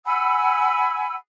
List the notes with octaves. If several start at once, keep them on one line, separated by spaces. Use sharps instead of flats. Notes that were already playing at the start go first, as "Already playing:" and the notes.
F#5 G#5 B5 E6